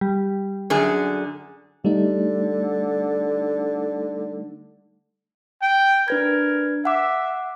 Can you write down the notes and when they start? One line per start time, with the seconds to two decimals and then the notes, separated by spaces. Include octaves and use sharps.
0.01 G3
0.70 F#2 D3 G#4
1.85 D3 G3 A3 D#4
5.62 G5
6.08 D4 A#4 B4 G#6
6.85 E5 F#5 D6